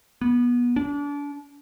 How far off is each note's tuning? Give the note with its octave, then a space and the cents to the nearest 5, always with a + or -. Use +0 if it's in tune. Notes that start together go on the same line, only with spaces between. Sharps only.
B3 -25
D4 -35